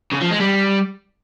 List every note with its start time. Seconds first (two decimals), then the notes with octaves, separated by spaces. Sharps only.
0.12 C#3
0.22 F3
0.31 G#3
0.41 G3